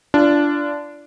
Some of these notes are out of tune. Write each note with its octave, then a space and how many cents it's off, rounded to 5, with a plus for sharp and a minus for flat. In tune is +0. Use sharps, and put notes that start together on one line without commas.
D4 -10 F4 -35